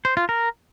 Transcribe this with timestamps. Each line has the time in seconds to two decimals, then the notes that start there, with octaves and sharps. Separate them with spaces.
0.05 C5
0.17 F4
0.29 A#4